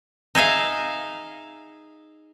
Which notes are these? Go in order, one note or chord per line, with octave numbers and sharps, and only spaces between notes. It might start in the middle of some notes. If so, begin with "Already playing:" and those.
D#4 G#4 E5 F5